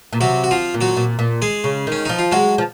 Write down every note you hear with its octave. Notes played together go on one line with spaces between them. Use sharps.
A#2
C3 F#3 F#4
F#4
F3 F4
A#2
F#3 F#4
A#2
A#2
G#3 G#4
C#3
D#3 C#4
F3 D#4
F4
F#3 G#3 F#4
F3